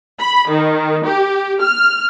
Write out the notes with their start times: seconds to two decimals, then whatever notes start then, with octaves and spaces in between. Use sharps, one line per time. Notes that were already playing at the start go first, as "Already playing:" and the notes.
0.20 B5
0.50 D#3
1.06 G4
1.61 F6